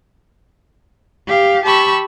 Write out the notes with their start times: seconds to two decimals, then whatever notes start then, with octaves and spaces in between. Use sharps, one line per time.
1.28 G4 F5
1.66 G4 A5 B5 C#6 E6